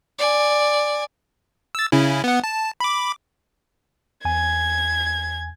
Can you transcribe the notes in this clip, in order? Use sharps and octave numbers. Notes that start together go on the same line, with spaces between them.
D5 G#5
E6 A6
C#3 C#4 E4
B3 F#5
A5
B5 D6
E2 G#5 G#6